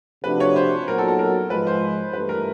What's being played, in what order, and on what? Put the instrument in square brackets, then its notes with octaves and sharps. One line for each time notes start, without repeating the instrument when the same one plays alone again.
[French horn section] C3 F3 A3 D4 F#4 [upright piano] B4
[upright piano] C#5
C5
[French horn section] A#2 F#3 B3 D#4 F#4 [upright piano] A#4
[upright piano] A4
A4
A#4
[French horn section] G#2 F3 G#3 [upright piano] B4
[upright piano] C5
[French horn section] G2 E3 A3 [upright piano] B4
[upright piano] A#4